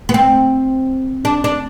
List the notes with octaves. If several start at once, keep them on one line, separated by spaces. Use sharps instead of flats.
B3
C4
D4
D4